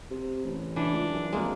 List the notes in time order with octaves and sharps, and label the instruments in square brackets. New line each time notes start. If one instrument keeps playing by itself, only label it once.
[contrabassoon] C3
A1
[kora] E3 [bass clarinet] D4
[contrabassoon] C#2
F#2
[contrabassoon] G#1 [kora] G#3 A#3